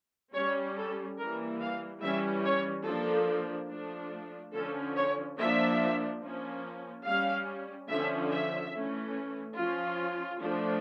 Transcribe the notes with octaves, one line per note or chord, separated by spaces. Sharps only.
G3 C#4 C#5
A4
E3 G3 A#3 A#4
F5
E3 G3 C#4 E5
C#5
F3 A#3 D4 A4
F3 A3 D4
D3 F3 C#4 A4
C#5
F3 A#3 D4 E5
F3 A#3 C#4
G3 C#4 F5
D3 F3 C#4 E5
E5
E3 A3 C#4
F3 C#4 F4
F3 A3 D4